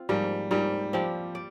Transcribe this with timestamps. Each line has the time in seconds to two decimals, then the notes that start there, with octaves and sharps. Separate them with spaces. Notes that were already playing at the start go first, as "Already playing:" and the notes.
Already playing: C4 F4
0.09 G#2 F3 G3 A#3
0.51 G#2 F3 G3 A#3
0.93 F3 C4 G4 D5
1.35 D5